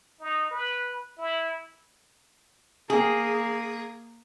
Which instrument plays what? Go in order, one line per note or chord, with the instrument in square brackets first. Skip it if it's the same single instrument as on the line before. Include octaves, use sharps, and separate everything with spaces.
[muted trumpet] D#4
B4
E4
[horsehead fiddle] A#3 [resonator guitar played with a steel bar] G#4